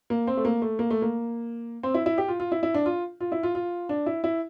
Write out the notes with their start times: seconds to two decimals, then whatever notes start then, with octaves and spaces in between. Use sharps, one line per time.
0.10 A#3
0.27 C4
0.37 A3
0.45 A#3
0.62 A3
0.79 A#3
0.90 A3
1.02 A#3
1.83 C4
1.94 E4
2.06 E4
2.18 G4
2.28 F4
2.40 F4
2.52 E4
2.63 E4
2.74 D4
2.86 F4
3.20 F4
3.32 E4
3.43 F4
3.55 F4
3.89 D4
4.06 E4
4.24 E4